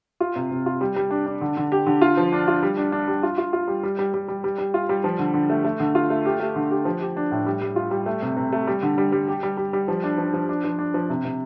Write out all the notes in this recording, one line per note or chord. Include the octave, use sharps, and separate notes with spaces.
F4
C3
C3
F4
G3
G3
D4
D4
D3
D3
G4
D3
F4
F3
D4
F4
G3
D4
D4
G3
F4
F4
F4
G3
G3
G3
G3
G3
G3
G3
F4
G3
F3
D3
D3
A3
A3
D3
F4
A3
G4
A3
D3
G4
F3
G4
D4
A2
G3
G3
F4
G3
A3
C3
C3
A3
G3
D3
G3
G3
G4
G3
G3
G3
F3
D4
F3
F3
D4
F3
D4
F3
C3
C3